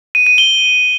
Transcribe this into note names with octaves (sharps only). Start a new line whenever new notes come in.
D#7
D#7
G7